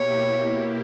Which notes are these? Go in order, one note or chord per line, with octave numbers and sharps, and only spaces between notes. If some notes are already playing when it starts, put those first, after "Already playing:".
Already playing: B2 A#3 E4 G4 C#5